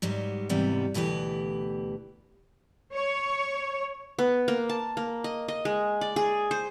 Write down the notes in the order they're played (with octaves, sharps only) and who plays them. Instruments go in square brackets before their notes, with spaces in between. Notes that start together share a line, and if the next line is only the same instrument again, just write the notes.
[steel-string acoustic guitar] G#2 F#3 G3 B3
E2 G#2 C3 E3 G3 B3
D2 B2 E3 G4 B4
[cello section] C#5
[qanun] B3
A#3
A5
A#3
D#5
D#5
G#3
D5
G#4
C5